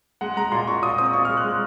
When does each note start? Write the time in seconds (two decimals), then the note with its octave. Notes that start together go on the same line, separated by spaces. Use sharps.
0.21 G#3 F#5
0.37 G#3 A#5
0.52 A#2 C6
0.67 A#2 C#6
0.82 A#2 D#6
0.98 C4 D#6
1.13 A#2 C#6
1.25 G#3 F6
1.37 F#6
1.44 G#3